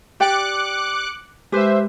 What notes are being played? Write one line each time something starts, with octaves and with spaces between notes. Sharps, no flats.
G4 D5 G5 D6 F#6 C#7
G#3 G4 B4 C5 E5